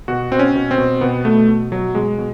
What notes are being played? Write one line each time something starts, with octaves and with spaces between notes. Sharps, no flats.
B2 F#4
B2 C4
C#4
B2
C4
B2
B2 B3
B2 A3
B2
B2 F#3
B2 G#3
B2